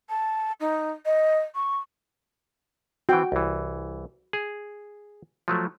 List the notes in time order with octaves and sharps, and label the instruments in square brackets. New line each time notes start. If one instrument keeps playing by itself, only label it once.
[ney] A5
D#4
D#5
C#6
[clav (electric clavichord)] E3 C4 [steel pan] F#4 G5
[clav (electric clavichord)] C2 E3
G#4
F3 F#3 A3